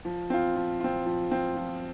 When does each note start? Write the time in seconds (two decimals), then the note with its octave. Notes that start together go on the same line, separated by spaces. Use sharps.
0.05 F3
0.30 C4 F4
0.56 F3
0.80 C4 F4
1.06 F3
1.31 C4 F4
1.56 F3